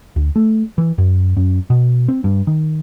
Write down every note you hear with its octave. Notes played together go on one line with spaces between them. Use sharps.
D2
A3
E3
F#2
F#2
B2
C4
G2
D#3